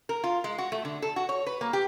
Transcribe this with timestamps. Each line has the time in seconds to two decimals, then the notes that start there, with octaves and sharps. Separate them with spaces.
0.09 A#4
0.24 F4
0.44 G#3
0.58 F#4
0.72 A3
0.85 D3
1.02 A4
1.16 F#4
1.29 C#5
1.46 B4
1.61 A#3
1.73 G4